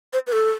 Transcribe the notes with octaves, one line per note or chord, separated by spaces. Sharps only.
C5
B4
A4